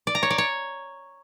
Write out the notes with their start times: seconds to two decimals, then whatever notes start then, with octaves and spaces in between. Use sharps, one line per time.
0.07 D5
0.15 A#5
0.23 C#5
0.30 D5
0.38 C#5